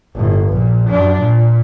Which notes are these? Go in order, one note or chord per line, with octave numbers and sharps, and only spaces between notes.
G1 A2
A#1 A#2
F#2 D4
A#2